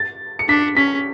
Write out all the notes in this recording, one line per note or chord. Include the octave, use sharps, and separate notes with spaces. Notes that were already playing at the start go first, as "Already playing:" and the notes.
Already playing: A6
C#7
D4 B6
C#4 B6